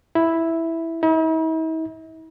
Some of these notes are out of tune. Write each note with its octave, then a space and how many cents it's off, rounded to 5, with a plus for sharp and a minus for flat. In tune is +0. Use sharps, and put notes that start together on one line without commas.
E4 +0
E4 -45